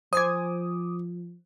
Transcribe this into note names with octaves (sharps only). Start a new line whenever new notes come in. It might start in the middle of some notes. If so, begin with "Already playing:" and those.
F3 C5 G#5 D6 D#6 G#6